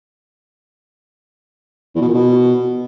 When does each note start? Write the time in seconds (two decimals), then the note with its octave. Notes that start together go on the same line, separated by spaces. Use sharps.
1.95 E2
2.01 B2
2.08 A#2
2.14 B2